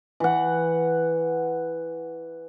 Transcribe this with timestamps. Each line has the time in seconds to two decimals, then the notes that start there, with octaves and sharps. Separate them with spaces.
0.20 E3 F#5